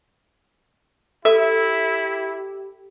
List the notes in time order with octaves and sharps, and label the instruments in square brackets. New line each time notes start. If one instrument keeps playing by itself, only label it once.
[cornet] E4 [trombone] G4 [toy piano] A4 [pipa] E5